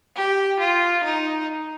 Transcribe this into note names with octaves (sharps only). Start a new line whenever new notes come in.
G4
F4
D#4